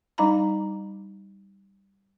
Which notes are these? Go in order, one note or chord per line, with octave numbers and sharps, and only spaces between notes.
G3 D4 D#4 F5 A#5 B5